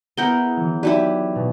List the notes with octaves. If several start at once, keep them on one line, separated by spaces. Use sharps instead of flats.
B3 E4 G#4 A#4 F#5 G6 G7
E3 F#3
D#4 E4 F#4 G4 B4 D5
B2